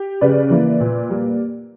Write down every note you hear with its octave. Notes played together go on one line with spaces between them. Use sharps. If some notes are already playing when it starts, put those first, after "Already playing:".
Already playing: G4
C#3 B4 D5
E3 A#3
A#2
G3 A#3